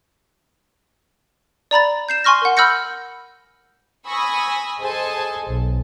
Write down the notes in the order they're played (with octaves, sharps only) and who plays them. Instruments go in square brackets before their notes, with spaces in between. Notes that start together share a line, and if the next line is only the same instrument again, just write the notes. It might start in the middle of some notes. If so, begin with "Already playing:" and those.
[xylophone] D5 A#5 B5 A6
G6 C7 E7
G#5 C6 C#6 F6 A#6
A#4 F#5
B5 E6 F6 G6 A#6 C#7
[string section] G#5 B5 C#6 D#6 E6 A#6
G#4 A4 C5 D#5 G#5 A5
B1